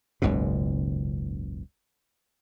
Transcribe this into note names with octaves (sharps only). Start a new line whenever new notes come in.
F#1 C#2 G#2 B2